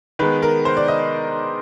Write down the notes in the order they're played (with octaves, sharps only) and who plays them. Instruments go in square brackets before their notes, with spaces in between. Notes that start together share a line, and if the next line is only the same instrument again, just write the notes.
[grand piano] D#3 G#3 B3 B4
A#4
C5
D5
D#5